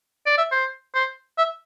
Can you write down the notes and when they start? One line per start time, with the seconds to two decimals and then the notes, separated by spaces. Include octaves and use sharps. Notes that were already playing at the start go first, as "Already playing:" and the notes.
0.26 D5
0.38 E5
0.52 C5
0.95 C5
1.38 E5